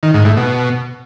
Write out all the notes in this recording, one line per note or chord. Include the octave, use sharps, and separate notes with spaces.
D#3
G#2
A2
B2